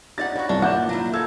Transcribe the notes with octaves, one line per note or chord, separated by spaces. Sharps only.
D4 D#4 G4 B4 F#5 A6
E4 F#4 C#5 F#5
C2 G2 D4
A#3 D#4 F4 F#5 D6 G6 E7
F#3 A#3 E4
A4 C#5 E6 G#6